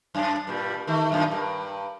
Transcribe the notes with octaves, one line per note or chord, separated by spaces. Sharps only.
F#2 D4
G2 A#2 G3
A#2
D#3 A3
F#2 A#2 D#3
G2 A#4